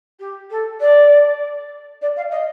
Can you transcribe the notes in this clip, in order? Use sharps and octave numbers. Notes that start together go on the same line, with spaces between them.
G4
A4
D5
D5
F5
D#5